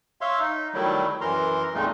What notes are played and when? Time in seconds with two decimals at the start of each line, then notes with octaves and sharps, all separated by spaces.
0.21 C#5 E5 F5 C6
0.39 D#4
0.74 D#3 F#3 G3 A3 E4
1.21 F#2 E3 A#4 A#5 C6
1.74 F2 A#2 G#3 A3 D#4 F4